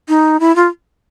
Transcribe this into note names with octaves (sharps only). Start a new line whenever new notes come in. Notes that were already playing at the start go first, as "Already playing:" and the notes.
D#4
E4
F4